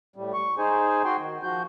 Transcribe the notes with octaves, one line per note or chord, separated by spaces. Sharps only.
A2 G3
C#6
D#4 G#4 C5 G#5
F#4 G5 C6
D#3
F3 F#4 G6